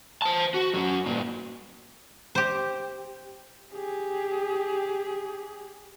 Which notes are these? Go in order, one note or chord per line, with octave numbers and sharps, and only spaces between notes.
C5 A5
F#4
F#2 F#3
G2 A#2
G4 C5
G4 G#4